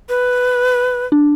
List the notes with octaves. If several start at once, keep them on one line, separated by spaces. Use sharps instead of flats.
B4
D4